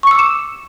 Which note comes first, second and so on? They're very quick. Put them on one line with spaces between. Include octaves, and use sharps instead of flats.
C#6 C#7 E6 D6 E7